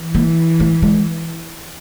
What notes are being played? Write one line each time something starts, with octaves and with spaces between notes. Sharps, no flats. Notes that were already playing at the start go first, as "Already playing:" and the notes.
Already playing: E3
A#3
A3
G#3